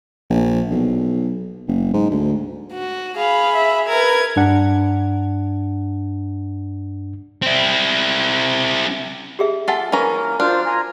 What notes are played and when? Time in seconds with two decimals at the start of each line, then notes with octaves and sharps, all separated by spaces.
0.30 A#1
0.70 B1
1.68 F#1
1.93 G#2
2.10 D2
2.73 F#4
3.17 G#4 F5 B5
3.55 E5
3.88 A#4 B4 G#6
4.36 G2 D4 F#5
7.42 C4 E4
9.39 G4 G#4 E5
9.68 F4 A4 E5 F#5 G#5
9.92 E3 A#3 C#4 A#4 A#5
10.40 D4 F4 F#4 C5 F6
10.66 F4 G#5 A#5